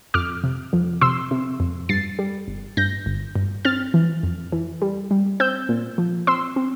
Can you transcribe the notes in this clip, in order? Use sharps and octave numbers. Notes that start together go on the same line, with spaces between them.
F2 D6 F6
C3
F2
C3 C6 E6
C3
F2
G2 A6 C7
G3
G1
G2 G6 A#6
G1
G2
C4 F6 A6
E3
F2
E3
G3
G3
C4 E6 G6
A#2
F3
C4 C6 E6
C4